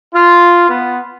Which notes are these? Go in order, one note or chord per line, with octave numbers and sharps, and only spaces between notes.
F4
B3